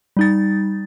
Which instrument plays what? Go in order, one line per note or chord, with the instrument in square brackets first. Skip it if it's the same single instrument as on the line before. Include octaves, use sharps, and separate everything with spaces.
[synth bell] G3 D#4 A6